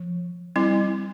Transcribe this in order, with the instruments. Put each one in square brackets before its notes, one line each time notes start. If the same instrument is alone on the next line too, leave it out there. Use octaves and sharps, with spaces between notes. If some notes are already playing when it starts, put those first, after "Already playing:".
Already playing: [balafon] F3
G3 C4 E4